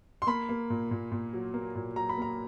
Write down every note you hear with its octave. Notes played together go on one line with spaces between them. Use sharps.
C6
A#3 B5
A#3
A#2
A#2
A#2
F#3
A#3
A#2
F#3 A#5
B5
A#3 A#5